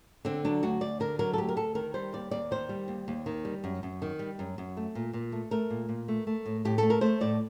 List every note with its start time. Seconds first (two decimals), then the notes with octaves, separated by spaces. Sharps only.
0.25 D3 C4
0.45 F#3 D4
0.63 D2 F#4
0.81 D2 D5
1.00 D3 A#4
1.19 F#3 A#4
1.33 A4
1.38 D2 G4
1.49 A#4
1.57 D2 A4
1.75 D#3 A#4
1.94 G3 C5
2.13 D#2 D5
2.31 D#2 D5
2.51 D#3 C5
2.69 G3
2.88 D#2
3.08 D#2
3.26 D#3
3.45 G3
3.64 F#2
3.83 F#2
4.02 D#3
4.19 G3
4.39 F#2
4.58 F#2
4.77 A3
4.95 A#2
5.13 A#2
5.32 A3
5.51 A3 A#4
5.70 A#2
5.89 A#2
6.08 A3
6.27 A3
6.46 A2
6.65 A2 G4
6.78 A3 A4
6.90 A#4
7.01 A3 C5
7.21 A2 D5